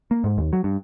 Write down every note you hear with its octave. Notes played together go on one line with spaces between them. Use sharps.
A#3
G#2
D#2
F#3
G2